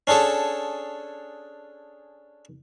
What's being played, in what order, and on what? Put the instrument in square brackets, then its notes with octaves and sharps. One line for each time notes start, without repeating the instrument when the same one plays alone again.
[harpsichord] C#4 D4 G#4 A4 C#5